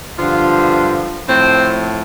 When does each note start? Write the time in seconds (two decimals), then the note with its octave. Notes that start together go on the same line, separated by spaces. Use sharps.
0.18 G2 D3 F3 F4
1.27 A2 F3 C4